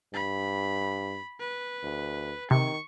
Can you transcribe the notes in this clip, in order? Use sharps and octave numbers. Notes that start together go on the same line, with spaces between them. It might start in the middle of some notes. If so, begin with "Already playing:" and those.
G2 B5
B4
D2
C3 D#3 C#6